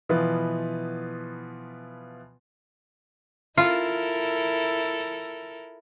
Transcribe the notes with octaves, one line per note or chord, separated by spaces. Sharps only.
B2 E3 F3 B3 F4 B4
E4 F4 A4 A#4